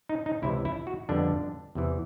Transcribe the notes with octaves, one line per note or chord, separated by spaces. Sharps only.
D#4
D#4
C#2 C3 E3 E4
E4
F#4
F2 D3 G3 B3 D4
E2 C3 E3